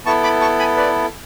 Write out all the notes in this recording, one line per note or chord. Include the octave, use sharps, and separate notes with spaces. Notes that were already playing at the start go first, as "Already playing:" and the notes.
B3 E4 A4 A5 C#6
B5 D6
A5 C#6
G#5 B5
B4 D5